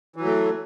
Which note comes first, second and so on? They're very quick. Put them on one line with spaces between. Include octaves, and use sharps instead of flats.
E3 F#3 A3